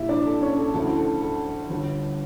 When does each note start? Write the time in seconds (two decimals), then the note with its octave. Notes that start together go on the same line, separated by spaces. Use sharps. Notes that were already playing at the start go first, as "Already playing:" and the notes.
Already playing: A#1 A#2 G3 E4 E5
0.09 D4 D5
0.25 A4
0.41 C#4 C#5
0.58 A4
0.73 D2 D3 F3 C#4 E4 A4
0.97 A4
1.21 A4
1.70 G1 G2 D3